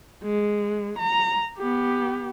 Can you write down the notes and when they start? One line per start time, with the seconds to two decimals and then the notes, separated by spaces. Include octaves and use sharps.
0.23 G#3
0.99 A#5
1.58 B3 G4